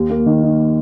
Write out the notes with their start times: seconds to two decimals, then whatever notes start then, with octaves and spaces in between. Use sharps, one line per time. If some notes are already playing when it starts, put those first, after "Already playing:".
Already playing: D#2
0.10 A#3
0.26 D#3
0.43 D#4